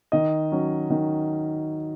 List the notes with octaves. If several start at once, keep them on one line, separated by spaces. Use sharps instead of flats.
D#3 D#5
F#3 C#4
D#3